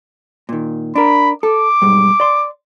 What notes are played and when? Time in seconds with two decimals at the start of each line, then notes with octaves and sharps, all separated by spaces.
0.49 A#2 D#3
0.96 D4 A#4 B5
1.43 A4 D6
1.82 B1 G#2 G3
2.20 D5 C6